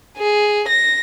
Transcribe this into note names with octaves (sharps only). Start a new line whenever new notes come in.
G#4
A#6